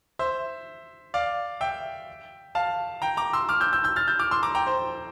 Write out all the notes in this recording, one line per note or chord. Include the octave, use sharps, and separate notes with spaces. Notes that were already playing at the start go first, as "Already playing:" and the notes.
C5 E5
D5 F5
E5 G5
F5 A5
G5 A#5
A#5 D6
C6 E6
D6 F6
E6 G6
E6 G6
E6 G6
F6 A6
E6 G6
D6 F6
C6 E6
A#5 D6
G5 A#5
C5